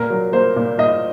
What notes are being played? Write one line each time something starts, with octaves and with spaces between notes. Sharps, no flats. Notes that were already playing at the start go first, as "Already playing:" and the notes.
Already playing: A#2 A#4
F#3
A#3 C5
A#2
A#2 D#5